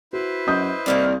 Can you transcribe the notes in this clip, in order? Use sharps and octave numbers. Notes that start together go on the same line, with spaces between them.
E4 F#4 B4 C5
F#2 D#5 D#6 G6
C2 D#3 A#3 D5